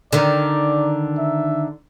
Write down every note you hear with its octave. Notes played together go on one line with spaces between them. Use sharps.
D3 D#3 D5
E5